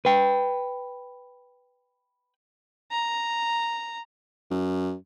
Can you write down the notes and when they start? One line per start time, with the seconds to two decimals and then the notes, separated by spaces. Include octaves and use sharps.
0.05 B4 G5
2.91 A#5
4.51 F#2